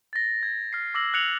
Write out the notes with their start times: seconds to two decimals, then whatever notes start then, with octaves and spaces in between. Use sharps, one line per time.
0.13 A6 A#6
0.43 G#6
0.73 F6 C7
0.94 D6 E6 A#6 F#7
1.14 F#6 G#6 C#7 F7 F#7